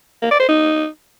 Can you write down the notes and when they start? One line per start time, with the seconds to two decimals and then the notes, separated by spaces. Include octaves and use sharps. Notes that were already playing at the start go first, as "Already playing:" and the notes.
0.22 A#3
0.31 D5
0.40 C5
0.49 D#4